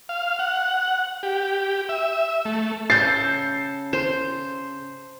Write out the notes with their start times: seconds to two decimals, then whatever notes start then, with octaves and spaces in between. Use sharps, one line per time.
0.09 F5
0.39 F#5
1.23 G4
1.89 E5
2.45 A3
2.90 C#3 A4 G6 A6 C7
3.93 C5